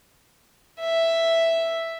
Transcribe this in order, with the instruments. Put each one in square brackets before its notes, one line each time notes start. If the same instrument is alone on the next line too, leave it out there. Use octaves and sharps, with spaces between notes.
[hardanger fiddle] E5